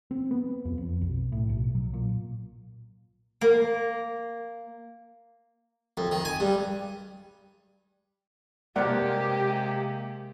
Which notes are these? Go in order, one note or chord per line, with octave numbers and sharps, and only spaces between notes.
C4
B3
F2
F2
B1
A2
B1
F#3
A#2
A#3
F2
D#3
G#5
G2
C3 G#3 A#3 G4 A#4 C5 D5 F#5